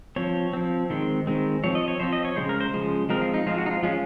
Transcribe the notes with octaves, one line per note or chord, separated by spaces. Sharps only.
F3 C4 C#5
F3 C4
D#3 G#3 C4
D#3 G#3 C4
F3 C4 C#5
D#5
C#5
F3 C4 C5
D#5
C#5
C#3 F3 G#3 C5
A#4
C5
C#3 F3 G#3
F3 G#3 C4 A#4
F4
D#4
F3 G#3 C4 F4
F#4
D#4
F4
F3 G#3 C#4 F4